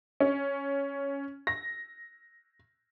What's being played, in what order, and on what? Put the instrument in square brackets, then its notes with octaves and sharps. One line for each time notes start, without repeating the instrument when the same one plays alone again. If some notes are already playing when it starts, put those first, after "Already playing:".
[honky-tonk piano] C#4
A#6